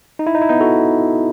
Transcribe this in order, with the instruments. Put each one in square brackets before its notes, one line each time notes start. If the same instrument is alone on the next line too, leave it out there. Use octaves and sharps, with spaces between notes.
[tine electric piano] D#4
E4
D#4
E4
B3 D#4
F#4 A4